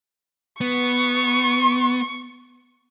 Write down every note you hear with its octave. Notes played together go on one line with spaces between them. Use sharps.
B3 C#6